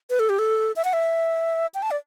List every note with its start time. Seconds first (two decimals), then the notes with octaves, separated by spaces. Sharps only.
0.10 B4
0.19 A4
0.29 G4
0.39 A4
0.76 E5
0.85 F#5
0.93 E5
1.74 G5
1.82 A5
1.91 D5